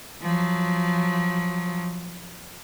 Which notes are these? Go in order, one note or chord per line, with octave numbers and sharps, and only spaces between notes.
F3 F#3